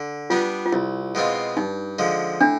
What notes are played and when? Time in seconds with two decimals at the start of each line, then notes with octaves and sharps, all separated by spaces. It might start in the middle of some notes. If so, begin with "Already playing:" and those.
Already playing: D3
0.30 G3 B3 D4 F4
0.66 F4
0.72 C2 E4
1.15 B2 G#3 C4 F4
1.57 G2 D#4
1.99 D3 F3 G#3
2.41 A2 D4